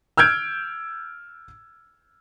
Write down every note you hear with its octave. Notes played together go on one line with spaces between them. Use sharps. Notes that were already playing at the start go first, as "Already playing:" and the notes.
E6 F6 G6 G#6 D7